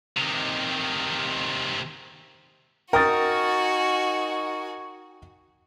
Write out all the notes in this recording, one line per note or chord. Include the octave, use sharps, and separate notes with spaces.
C3 D#3
D#4 F#4 A#4 G5 G#5 C#6 D#6 A6